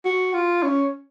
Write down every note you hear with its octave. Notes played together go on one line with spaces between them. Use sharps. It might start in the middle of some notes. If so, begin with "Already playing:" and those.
F#4
F4
C#4